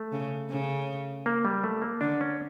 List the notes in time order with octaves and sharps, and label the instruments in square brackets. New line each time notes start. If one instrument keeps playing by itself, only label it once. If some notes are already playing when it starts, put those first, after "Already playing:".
Already playing: [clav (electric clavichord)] A3
[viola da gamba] C#3
C#3
[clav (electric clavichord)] A#3
G3
A3
A#3
[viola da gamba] D3 [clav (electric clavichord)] D4
[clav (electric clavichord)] C#4